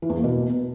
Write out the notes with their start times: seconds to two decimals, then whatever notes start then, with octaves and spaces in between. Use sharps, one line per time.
0.02 E3
0.09 E2
0.17 A#3
0.24 B2